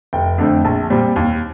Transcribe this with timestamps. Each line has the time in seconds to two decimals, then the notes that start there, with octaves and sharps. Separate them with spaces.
0.13 F1 G5
0.38 F2 D3 A3 C4
0.65 A#1 A5
0.90 A#2 G3 C4
1.16 D#2